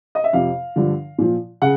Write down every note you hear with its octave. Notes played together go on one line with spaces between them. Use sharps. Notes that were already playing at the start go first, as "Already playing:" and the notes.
D#5
E5
F2 C3 F3 F5
G2 D3 F3
A#2 F3
C#3 F#5